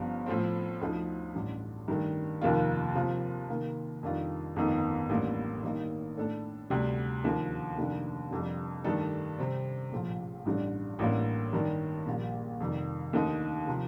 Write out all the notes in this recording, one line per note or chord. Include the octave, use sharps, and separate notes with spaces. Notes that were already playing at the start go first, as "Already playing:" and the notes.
Already playing: G1 G2 F3
A2 F3 A3 C4
D2 D3 F3 A3 D#4
A1 G2 D3 A3
G2 D#3 A3
F1 D#2 D#3 A#3 F4
C3 F3 C4 F4
C3 D#3 A#3
F2 D#3 G3 D4 F4
G1 F2 D#3 A3 D#4
A1 A2 G3 A#3 D4
G2 D#3 A#3 D#4
A2 A3 D4 A4
D2 C3 G3
D#2 D3 F3
F1 D#2 D3 A3 D4
F1 F2 D3 G3
G2 D#3 A3 D4 A4
C3 G3 C4
A#1 A2 F3 A3
A1 G2 D3 G3 D4
A1 A2 G3 A#3 D4
G2 D#3 G3
A#1 A#2 G3 A#3
F2 C3 D#3 G3
D#2 D3 A3 D#4
C3 F3